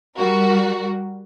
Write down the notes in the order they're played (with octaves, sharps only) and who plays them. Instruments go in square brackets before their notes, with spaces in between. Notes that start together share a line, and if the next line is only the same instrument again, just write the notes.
[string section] G3 F#4 A#4